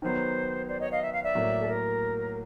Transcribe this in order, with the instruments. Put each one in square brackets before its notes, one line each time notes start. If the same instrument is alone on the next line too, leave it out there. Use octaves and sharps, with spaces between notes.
[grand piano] D#3 F#3 B3 [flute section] C5
[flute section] C5 D5
C#5 D#5
D#5 F5
E5
F5
D5 E5
[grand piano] A2 F#3 A#3
[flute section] A4
A#4